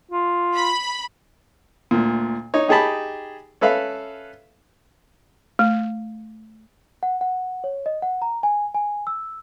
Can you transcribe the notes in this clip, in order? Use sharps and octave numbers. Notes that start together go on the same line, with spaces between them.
F4
B5
D2 A#2
D#4 C#5
D#4 G4 G#4 G5 A5 B5
C#4 A4 B4 E5 F5 B5
A3
F#5
F#5
C#5
D#5
F#5
A#5
G#5
G#5
E6